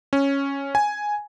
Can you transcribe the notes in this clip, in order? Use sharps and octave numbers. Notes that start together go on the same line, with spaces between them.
C#4
G#5